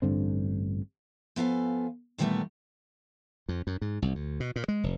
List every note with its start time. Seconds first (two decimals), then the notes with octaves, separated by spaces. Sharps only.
0.02 A1 G2 D3 C4
1.36 F3 B3 A4 F5 G#5
2.18 A#2 D#3 E3 G3 A3 B3
3.49 F2
3.67 F#2
3.81 G#2
4.02 C2
4.15 D2
4.40 B2
4.56 A#2
4.68 G#3
4.84 F1